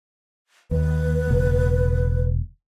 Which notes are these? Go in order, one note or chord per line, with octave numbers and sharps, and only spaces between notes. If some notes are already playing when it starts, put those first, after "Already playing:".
D#2 B4
E1 C#3 A#3